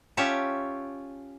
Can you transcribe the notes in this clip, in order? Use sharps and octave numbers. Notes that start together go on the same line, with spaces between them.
C#4 F4 G4 C#5 E5 A5